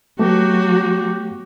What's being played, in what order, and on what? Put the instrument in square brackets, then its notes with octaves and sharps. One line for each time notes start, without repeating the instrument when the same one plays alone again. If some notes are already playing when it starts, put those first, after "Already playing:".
[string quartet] F#3 [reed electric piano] A3 B3 [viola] F#4 [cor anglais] G4